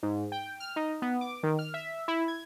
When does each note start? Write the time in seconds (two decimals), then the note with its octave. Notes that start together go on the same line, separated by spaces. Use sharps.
0.03 G#2
0.32 G5
0.60 F6
0.76 D#4
1.02 B3
1.21 D6
1.43 D#3
1.59 F6
1.74 E5
2.08 E4
2.28 G#6